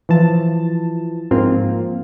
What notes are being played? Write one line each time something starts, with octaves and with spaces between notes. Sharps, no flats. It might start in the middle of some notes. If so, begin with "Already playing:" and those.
E3 F3 A5
G#2 F3 A#3 C4 F4